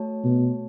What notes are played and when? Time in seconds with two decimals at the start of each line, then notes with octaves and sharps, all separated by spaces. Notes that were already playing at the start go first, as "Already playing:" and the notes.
Already playing: A3 F#4 C#5 A5
0.24 B2